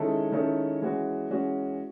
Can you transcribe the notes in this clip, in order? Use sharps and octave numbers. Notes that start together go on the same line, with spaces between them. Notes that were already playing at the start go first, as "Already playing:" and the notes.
Already playing: D#3 G#3 C#4 E4 A4
D#3 G#3 C#4 E4 A4
E3 G#3 C#4 F#4
E3 G#3 C#4 F#4